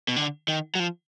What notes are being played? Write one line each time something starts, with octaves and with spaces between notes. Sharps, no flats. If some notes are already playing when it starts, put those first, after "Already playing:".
B2
D3
D#3
F#3
F3